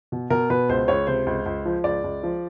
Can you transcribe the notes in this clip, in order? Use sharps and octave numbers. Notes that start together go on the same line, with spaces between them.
B2
B2 A#4
B2 B4
C#2 C5
C#2 C#5
C3 C5
C#2
C#2
F3
C#2 D5
C#2
F3